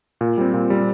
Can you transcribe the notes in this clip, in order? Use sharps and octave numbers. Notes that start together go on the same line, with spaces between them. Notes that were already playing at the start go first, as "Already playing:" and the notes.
A#2
G3 C4
A#2
G3 C4